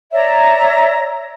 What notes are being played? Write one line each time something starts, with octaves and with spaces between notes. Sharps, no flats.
C#5 D5 E5 A#5